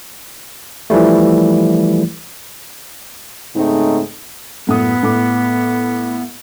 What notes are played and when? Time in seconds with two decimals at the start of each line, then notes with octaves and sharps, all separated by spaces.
0.90 E3 F3 G3 A3
3.56 G#2 C#3 A3 C4 D#4
4.67 F#2 A2 B3 D#6
5.03 A2 D6